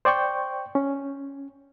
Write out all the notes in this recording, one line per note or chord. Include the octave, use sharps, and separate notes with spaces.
C5 D5 G5 C#6 G6
C#4